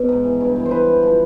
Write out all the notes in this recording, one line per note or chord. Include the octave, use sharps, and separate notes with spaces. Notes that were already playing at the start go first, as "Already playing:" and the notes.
Already playing: B2
G#2
E3
G2
E3
C5
E3 B4
E3
F3